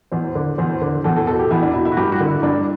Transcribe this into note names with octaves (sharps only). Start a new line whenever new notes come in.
E2 C5
D3
E2 C5
D3
E2 A4
A4
B2 A4
G4
E2 E4
D4
B2 E4
E4
F#4
G2 G4
F#4
D3
E4
G2 D4